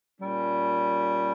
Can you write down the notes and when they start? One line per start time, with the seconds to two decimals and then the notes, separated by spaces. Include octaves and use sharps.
0.21 A#2 G3 C#4